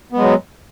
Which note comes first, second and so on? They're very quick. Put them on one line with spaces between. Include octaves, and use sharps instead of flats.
B3 G#3 F#3